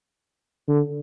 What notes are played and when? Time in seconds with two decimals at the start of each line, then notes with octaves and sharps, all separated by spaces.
0.68 D3